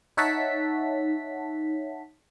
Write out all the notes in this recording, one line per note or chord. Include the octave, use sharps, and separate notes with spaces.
D#4 C#5 E5 F#5 A5 B6